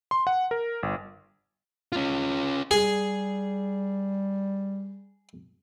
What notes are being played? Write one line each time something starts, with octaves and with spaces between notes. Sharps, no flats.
C6
F#5
A#4
G1
C#4 F4
G3 G#4